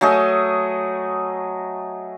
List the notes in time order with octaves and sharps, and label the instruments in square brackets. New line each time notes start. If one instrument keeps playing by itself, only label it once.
[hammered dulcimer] F#3 A3 G#4 D#5